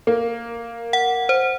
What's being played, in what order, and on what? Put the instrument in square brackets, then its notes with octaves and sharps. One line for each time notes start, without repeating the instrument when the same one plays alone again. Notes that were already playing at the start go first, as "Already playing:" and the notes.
[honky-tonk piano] A#3
[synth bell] F#5
C5